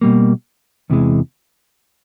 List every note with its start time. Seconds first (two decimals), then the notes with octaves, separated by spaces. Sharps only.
0.01 B2 G3 A#3
0.90 E2 C3 E3 G#3